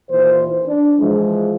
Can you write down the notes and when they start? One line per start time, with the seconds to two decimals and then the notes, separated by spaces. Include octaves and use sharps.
0.10 D#2 A#2 E3 C5
0.65 D4
0.99 E3 F3 G#3